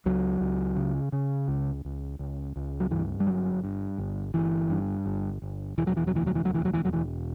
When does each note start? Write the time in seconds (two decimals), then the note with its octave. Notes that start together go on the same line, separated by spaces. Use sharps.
0.06 C#2 F#3
0.40 C#2
0.76 C#3
1.12 C#3
1.48 C#2
1.85 C#2
2.19 C#2
2.56 C#2
2.80 F#3
2.91 G2 E3
3.20 G3
3.27 G1 F#3
3.64 G2
3.98 G1
4.34 G1 E3
4.70 G2
5.06 G1
5.42 G1
5.78 E1 E3
5.87 F#3
5.97 E3
6.07 F#3
6.14 D2 E3
6.26 F#3
6.35 E3
6.45 E1 F#3
6.54 E3
6.65 F#3
6.74 E3
6.84 E1 F#3
6.93 E3